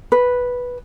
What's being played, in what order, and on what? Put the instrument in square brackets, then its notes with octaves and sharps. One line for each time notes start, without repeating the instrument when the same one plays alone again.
[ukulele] B4